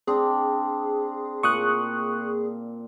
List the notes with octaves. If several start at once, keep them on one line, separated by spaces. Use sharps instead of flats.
C4 D4 G#4
A#2 C#6 D#6 F#6